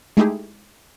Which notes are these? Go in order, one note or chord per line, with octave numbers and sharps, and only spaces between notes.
G#3 A3 D#4 E4 G4 G#4